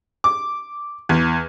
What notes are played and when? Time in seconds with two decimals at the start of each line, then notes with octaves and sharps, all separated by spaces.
0.24 D6
1.09 E2